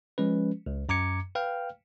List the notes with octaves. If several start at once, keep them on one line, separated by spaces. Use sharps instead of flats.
F3 G#3 C#4 B4
C#2
F#2 A#5 D6 G#6 C#7
B4 F5 G5 F6